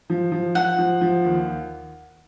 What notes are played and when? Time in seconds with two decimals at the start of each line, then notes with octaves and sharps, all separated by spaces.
0.10 F3
0.32 F3
0.55 F3 F#5
0.78 F3
1.01 F3
1.25 D#2